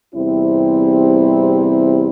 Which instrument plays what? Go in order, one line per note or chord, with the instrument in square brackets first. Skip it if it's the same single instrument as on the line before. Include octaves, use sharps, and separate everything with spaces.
[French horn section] E2 C3 G3 C4 E4